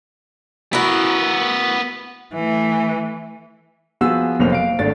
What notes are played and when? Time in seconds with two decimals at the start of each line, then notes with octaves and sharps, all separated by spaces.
0.73 B3 E4 F#4 A#4
2.34 E3 A3
4.01 F3 B3 F#4 G#4 E6
4.39 F1 B1 A#2 C5 F7
4.52 F5 D7
4.79 G#1 A3 D4 A6